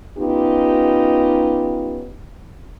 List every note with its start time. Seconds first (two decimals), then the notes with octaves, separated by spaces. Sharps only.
0.18 B3 C#4 D#4 F4 G4